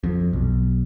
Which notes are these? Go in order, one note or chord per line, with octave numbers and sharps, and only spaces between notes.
F2
B1